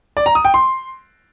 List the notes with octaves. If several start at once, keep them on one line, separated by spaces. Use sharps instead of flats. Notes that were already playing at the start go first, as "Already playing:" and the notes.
D5
A#5
D#6
G5
C6